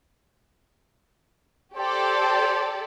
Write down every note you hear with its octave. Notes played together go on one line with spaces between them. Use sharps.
G4 A4 C5 D5